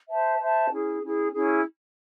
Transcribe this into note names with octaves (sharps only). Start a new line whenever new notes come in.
C5 E5 A5
C5 E5 A5
C#4 E4 G#4
C#4 E4 G#4
C#4 E4 G#4